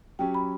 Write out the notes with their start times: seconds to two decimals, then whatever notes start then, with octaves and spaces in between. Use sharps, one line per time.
0.19 F#3 C#4 G4 G5
0.34 B5